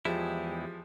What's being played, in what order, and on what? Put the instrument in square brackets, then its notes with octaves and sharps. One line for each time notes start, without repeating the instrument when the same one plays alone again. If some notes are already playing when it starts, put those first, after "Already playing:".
[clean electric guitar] E2 G#3 E4 [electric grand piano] F3 G#4 [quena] G4